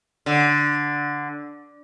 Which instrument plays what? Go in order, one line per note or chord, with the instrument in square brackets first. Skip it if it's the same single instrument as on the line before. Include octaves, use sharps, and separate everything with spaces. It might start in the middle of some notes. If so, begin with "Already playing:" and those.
[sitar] D3